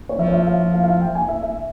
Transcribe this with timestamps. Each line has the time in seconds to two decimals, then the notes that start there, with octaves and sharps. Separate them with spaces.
0.09 C#5
0.19 F3 E5
0.28 C#5
0.33 E5
0.47 F5
0.60 E5
0.74 F5
0.84 F5
0.88 E5
1.01 G5
1.15 G#5
1.29 E5
1.43 E5